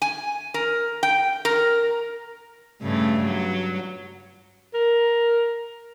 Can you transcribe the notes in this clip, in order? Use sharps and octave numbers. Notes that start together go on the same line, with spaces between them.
G#5
A#4
G5
A#4
G2 C#3 A3
F#3
A#4